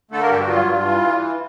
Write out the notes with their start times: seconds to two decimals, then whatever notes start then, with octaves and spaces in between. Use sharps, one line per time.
0.11 D3 A3 A4
0.20 A#3 A#4
0.30 G2 G3 G4
0.40 F#4
0.48 F#3 F4
0.67 G2
0.86 E3